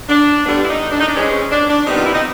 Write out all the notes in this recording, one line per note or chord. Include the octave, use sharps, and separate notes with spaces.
D4
D3 G3 B3 D4
E4
D#4
D4
D#4
D4
E3 G#3 C4 C#4
C#4
D4
D4
C3 D#3 G3 B3 D#4
F4
E4
D#4